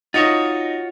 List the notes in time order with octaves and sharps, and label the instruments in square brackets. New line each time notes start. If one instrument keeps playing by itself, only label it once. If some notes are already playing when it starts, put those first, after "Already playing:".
[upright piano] D#4 D#5 [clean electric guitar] F4 F#4 C#5